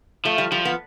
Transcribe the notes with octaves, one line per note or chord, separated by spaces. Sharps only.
F3 A3
G3
F3 G3
B3